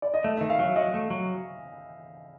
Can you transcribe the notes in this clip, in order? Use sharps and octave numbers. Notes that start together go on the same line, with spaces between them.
D5
D#5
A3 E5
E5
D#3
F5
F#3 E5
F#3 D#5
A3
F#3